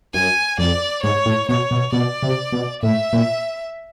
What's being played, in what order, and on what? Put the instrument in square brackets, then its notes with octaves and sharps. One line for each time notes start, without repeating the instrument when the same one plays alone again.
[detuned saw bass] F#2 [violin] G#5
[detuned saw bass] F2 [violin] D5
[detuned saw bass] G#2 [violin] C#5
[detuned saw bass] A2
[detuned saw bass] B2 [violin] C#5
[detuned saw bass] B2
[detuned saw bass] B2 [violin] D5
[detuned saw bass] C3
B2
[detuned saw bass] A2 [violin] E5
[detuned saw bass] A#2